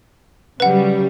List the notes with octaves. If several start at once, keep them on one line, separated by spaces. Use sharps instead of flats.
C#3 F#3 G3 B4 F#5